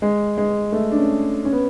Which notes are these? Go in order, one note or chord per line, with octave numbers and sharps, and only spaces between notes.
G#3
G#3
A3
D4
C#4
C#4
B3